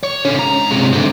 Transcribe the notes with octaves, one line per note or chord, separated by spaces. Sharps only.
C#5
D3 C#4
G#2 A#5
C3 G#3
G#2 D3